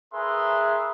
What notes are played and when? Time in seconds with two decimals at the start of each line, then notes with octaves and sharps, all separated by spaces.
0.13 C#4 G#4 A#4 B4 E5 C6